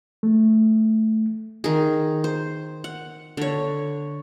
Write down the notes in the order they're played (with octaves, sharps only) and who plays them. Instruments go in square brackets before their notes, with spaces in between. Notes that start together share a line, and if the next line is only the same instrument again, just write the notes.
[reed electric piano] A3
[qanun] D#3 G#4
C5
F#5
D3 C#5